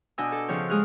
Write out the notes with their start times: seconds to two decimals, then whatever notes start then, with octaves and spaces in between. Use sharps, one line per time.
0.18 B2 D4 D#5 G#5 E6
0.32 A4
0.48 C#3 F3 C4 C#5
0.69 G#3 G#4 F6 F#6